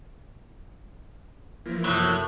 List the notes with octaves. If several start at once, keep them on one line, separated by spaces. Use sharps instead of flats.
E3 F3 A#3
F#2 A2 C3 F#3